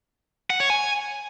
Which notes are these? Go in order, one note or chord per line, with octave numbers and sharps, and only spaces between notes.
F#5
C#5
G#5